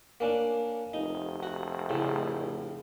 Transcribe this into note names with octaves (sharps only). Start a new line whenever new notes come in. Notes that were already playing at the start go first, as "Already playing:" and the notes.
A#3 C#4 D4
F1 D#4
F#4
A2 C#3